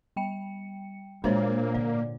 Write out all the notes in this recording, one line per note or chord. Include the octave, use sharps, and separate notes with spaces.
G3 G5 C#7
A#2 G#3 A#3 D4 C5 C#5
G#2 D3 D5